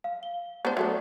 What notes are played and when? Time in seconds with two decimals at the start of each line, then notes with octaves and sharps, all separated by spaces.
0.04 F5
0.23 G7
0.65 B3 D4 C5
0.77 F#3 A3 D4 A4 E5